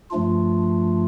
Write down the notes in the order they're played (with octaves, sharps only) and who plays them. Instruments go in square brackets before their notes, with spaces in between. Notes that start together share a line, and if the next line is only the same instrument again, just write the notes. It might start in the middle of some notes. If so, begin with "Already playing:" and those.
[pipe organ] G2 F3 A3 D4 F4